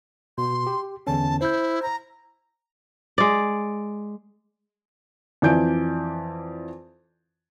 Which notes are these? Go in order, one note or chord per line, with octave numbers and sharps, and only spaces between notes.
B2 C6
G4
E2 D3 C#4 A5
E4 C5 G6
A#5
G#3 D5
F2 E3 D5 G#5 G6 D7